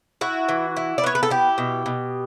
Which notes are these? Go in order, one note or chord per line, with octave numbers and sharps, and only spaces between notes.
E4 F#4
E3
E4
D5
B3 C#5
B4
A4
E4 G4
B2
B2